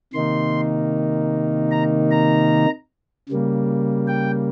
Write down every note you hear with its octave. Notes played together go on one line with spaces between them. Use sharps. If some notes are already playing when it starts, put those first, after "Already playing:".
C3 D#3 A#3 D#4 C6
A#5
A#5
C#3 G3 A#3
G5